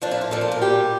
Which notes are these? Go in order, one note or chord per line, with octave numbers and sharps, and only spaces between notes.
A#2 F3 D4
E4
F4
A#2 F3 A4
F4
A#4
A#2 G3 G4